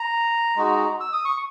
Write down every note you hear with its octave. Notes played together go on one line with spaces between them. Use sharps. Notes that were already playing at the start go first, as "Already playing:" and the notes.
Already playing: A#5
G#3 D#4 F#4
E6
D#6
C#6